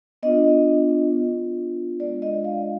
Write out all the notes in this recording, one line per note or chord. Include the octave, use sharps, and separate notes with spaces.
B3 D4 F4 D#5
B3 D4 F4
G#3 D4 F4 D5
D#5
F5